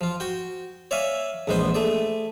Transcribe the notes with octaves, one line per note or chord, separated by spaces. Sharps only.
F3 F4
F#4 G5
C#5 D5 E5 F5 G#5
A#1 E2 G#3 B3 C5 C6
A3 G#4 D5